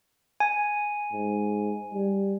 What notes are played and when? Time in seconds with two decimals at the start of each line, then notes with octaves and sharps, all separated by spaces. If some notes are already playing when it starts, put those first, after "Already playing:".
0.40 G#5
1.13 G#2
1.93 G3